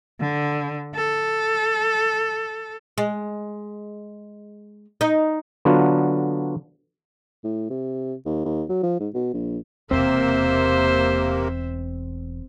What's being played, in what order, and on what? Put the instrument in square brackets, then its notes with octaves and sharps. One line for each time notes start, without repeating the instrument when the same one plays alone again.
[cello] D3
A4
[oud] G#3
D#4
[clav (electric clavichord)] D3 F#3 B3 D4 F4 F#4
[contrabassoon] A2
C3
D#2
D#2
F#3
F3
G#2
B2
A#1
[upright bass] E1 E2 [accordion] C3 A#3 [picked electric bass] C4 [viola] C5 E5